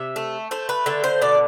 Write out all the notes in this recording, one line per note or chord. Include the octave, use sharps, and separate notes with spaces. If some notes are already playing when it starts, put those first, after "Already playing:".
Already playing: C3 E5
A3
A3 C5
B4
D3 A4
C5
B2 D5